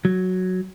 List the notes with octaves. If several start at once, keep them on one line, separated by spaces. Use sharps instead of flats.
F#3